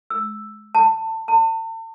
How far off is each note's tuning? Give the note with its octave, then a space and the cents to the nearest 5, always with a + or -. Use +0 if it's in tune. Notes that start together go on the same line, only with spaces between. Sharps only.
E6 +5
A5 +25
A5 +40